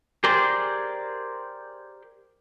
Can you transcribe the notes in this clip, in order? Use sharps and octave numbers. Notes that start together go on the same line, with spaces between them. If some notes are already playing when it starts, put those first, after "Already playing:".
G4 G#4 A#4 C5 D5